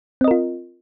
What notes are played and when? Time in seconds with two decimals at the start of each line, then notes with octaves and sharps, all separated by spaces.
0.21 C4
0.24 D#5
0.28 A#4
0.31 F4